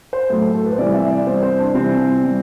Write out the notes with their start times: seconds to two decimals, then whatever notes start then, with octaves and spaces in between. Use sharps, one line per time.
0.13 C5
0.29 A2 F#3 A4
0.41 A4
0.54 A4
0.66 B4
0.73 C5
0.78 C3 E3 G3 D5
0.94 E5
1.11 D5
1.26 C3 E3 G3 C5
1.43 C5
1.58 D4
1.75 C3 E3 G3 C4
2.24 C3 E3 G3